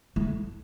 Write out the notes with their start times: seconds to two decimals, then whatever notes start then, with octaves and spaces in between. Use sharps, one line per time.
0.16 A3